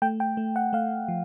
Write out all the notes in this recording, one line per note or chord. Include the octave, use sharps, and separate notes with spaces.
A3 G5
G5
A3
F#5
A3 F5
F3